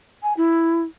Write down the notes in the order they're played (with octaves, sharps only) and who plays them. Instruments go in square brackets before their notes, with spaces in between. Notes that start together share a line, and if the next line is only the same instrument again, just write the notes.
[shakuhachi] G#5
E4